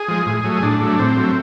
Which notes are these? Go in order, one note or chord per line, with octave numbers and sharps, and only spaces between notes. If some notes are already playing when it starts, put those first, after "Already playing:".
Already playing: G#4
F3 G#3
A2
F#3 A3
A2 D4
F#3 A3
A2 C4
F#3 A3